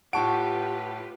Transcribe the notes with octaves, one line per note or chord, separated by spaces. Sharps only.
A2 F4 G4 B4 F#5 A5 C#6 D7